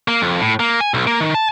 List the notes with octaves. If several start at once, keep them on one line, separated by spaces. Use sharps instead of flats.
A#3
F2
A2
A#3
G#5
B1
A#3
D#3
A5